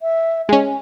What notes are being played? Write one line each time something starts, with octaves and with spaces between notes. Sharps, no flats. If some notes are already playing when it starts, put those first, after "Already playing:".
E5
G#3 C#4 G#5